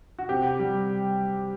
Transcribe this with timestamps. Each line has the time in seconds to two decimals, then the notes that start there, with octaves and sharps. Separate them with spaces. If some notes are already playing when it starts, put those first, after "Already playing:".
0.19 F#4
0.29 C3 G4
0.59 G3